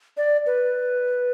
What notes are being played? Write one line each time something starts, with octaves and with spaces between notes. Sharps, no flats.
D5
B4